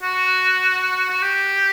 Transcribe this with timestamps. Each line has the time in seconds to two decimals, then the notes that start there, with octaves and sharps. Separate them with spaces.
0.02 F#4
1.10 F#4
1.22 G4